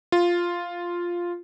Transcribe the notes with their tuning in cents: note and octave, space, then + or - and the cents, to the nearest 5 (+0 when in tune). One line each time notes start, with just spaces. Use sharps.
F4 +0